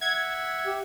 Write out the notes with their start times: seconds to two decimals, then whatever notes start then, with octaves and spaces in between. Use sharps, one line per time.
0.01 E5 F#5 G#6
0.66 G4